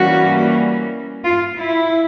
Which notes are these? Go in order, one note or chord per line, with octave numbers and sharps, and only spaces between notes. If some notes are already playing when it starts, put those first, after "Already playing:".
Already playing: E3 G3 A#3 C#4 F#4
F4
E4